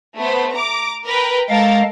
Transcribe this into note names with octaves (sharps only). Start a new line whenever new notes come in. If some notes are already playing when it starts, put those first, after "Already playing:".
A3 B3 C5
A#5 D6
A#4 B4 G5
G#3 A4 A#4 F5 A6